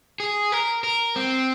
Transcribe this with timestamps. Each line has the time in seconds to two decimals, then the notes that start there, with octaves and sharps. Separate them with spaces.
0.20 G#4
0.52 A#4
0.84 A#4
1.16 C4